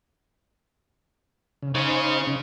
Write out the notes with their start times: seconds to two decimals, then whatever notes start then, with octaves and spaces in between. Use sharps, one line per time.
1.62 C#3
1.75 C#3 C#4 D#4 C5
2.27 C#3 C#4